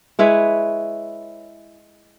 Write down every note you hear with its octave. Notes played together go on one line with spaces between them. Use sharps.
G#3 E4 B4 C#5